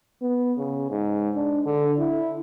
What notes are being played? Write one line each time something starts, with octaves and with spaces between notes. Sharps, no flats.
B3
C#3
G#2
D4
D3
E4